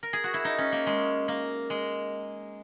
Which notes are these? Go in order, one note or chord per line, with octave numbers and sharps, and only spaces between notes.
A#4
G#4
F#4
E4
D#4
C#4
A#3
G#3
A#3
G#3